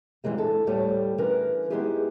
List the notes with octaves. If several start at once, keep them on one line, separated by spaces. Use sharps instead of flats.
F#2 E3 G3 G#3 A#3
D3 E4 A4
D2 A2 G3 A3 G4 C#5
D3 E3 C#4 A#4 B4
G#3 B3 D#4 E4 G4 G#4